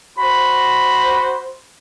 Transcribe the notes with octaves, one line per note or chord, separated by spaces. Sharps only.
F#4 C5 B5